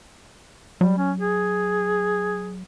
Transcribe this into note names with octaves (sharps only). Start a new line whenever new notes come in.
F#3 G3
C#4
G#4